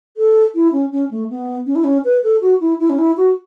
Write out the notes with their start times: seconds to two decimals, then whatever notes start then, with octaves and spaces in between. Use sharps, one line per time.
0.17 A4
0.55 E4
0.73 C#4
0.92 C#4
1.11 A3
1.30 B3
1.66 C#4
1.75 E4
1.84 C#4
2.05 B4
2.24 A4
2.41 F#4
2.61 E4
2.80 E4
2.90 C#4
2.98 E4
3.17 F#4